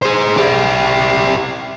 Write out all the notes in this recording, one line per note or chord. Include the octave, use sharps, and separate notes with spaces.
G#4 C5
E4 G4